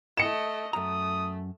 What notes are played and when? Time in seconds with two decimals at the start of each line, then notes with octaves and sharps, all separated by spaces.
0.17 A3 D#5 C#7 E7
0.73 F#2 A3 A#5 D#6